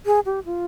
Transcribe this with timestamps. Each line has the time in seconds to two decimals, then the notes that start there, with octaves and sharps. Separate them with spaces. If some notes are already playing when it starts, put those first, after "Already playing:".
0.06 G#4
0.26 G4
0.45 F4